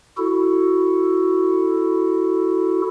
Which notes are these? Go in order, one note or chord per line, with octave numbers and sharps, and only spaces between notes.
E4 F#4 A4